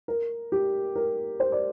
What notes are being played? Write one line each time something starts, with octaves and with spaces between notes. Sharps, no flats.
A#4
G4
A#4
C5
D5